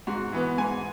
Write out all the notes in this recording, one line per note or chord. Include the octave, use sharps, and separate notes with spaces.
G#2 F#4
E3 B3
G#2 G#5